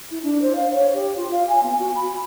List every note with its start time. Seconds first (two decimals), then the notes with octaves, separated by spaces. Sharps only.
0.11 E4
0.23 D4
0.42 C5
0.56 F5
0.73 C#5
0.94 G4
1.17 F4
1.32 F5
1.49 G#5
1.63 B3
1.79 F#4
1.96 B5